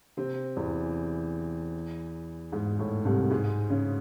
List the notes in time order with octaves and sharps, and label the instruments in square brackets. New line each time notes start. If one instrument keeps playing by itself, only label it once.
[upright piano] C3 C4
E2 E3
G#2
A2
C2 C3
G#2 G#3
C#3 C#4